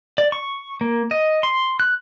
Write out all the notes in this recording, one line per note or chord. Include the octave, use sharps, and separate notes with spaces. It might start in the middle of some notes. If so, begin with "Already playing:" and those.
D5
C#6
A#3
D#5
C6
F#6